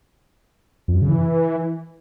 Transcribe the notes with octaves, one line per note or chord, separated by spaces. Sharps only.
F2
F#2
C#3
E3